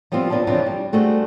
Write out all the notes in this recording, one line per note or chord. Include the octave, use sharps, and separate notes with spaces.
F3 G3 B3 C4 D4 F4
D#2 F3 D4 B4 D#5 A5
C#3 E3 F3 C4 D4 F4
G3
G3 A3 D4 F#4 G#4 C5